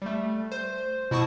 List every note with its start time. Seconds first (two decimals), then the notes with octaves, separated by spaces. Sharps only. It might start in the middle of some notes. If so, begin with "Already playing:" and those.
0.02 G3 A3
0.52 C5
1.11 B2 E4 F#4 A5 C#6 D#6